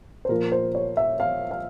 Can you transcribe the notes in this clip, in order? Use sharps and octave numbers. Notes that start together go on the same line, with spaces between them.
C5
A#2 F3 A#4
C5
C#5
E5
F5
F5